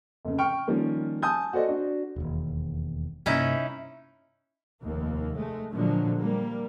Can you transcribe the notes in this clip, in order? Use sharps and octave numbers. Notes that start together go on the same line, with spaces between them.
F1 C#3
G5 C#6 F6 D7
D#3 F3 G3 A#3 C#4
G#5 A5 D#6 G6
F#4 A4 C5 D5 D#5
D4 F#4
E1 D#2
G2 C3 A#3 C#4 D#4 E4
F1 D#2 A#3
G#3 A3
A#2 D3 F3 F#3 G#3
G3 A#3